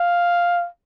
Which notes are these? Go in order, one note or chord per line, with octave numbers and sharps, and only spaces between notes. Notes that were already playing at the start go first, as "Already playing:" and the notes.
Already playing: F5